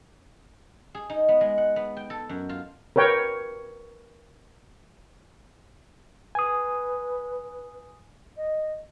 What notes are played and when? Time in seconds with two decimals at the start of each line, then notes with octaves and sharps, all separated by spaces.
0.95 G#4
1.10 D#4
1.28 B3
1.41 G#3
1.58 F#5
1.76 B3
1.97 G5
2.10 A4
2.29 F#2
2.49 F4
2.96 A#4 B4 C#5 G5
6.35 B4 G#5 D#6
8.36 D#5